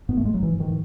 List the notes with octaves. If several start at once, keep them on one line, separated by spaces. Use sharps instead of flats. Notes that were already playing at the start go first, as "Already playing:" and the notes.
G#2 B3
A3
G#2 G#3
F#3
G#2 E3
G#2 D#3
E3